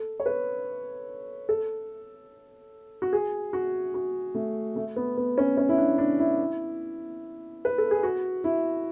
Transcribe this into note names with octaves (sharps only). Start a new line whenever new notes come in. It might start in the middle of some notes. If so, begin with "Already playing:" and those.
Already playing: A4
C#5
B4
A4
F#4
G#4
F#4
F#4
A3
A3
B3
B3
C#4
C#4
E4
D4
D4
E4
B4
A4
G#4
F#4
E4